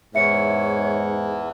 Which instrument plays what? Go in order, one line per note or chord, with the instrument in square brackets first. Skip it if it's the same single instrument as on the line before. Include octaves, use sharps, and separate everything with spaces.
[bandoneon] E2 E3 [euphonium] G#2 [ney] C#5 [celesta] E5 C#7